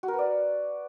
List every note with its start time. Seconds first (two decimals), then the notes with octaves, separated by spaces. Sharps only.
0.03 F#4
0.08 A#4
0.13 B4
0.18 D5